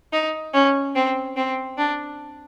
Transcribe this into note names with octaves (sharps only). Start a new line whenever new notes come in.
D#4
C#4
C4
C4
D4